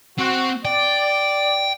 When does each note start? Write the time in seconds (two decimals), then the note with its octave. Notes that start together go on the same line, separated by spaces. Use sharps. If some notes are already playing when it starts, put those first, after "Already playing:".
0.18 C4 F#4
0.65 D5 G5